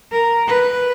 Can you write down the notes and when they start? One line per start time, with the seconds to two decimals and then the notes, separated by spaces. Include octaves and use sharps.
0.12 A#4
0.48 B4